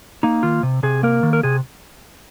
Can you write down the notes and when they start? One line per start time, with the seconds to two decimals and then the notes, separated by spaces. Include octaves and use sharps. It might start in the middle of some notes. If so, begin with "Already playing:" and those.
0.23 A#3 D#4
0.43 D#3 F4
0.63 C3
0.83 C3 G#4
1.03 A#3 A#4
1.23 D#3
1.33 A#4
1.43 C3 G#4